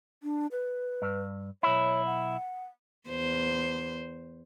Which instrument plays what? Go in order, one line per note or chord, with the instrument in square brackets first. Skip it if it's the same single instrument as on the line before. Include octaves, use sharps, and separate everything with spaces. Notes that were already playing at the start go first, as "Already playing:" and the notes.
[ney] D4
B4
[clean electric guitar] G2
[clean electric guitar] B1 E4 [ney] C#5
[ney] F#5
[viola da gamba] E2 C5